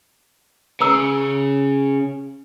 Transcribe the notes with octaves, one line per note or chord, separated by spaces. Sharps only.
C#3 B4 A#5 E6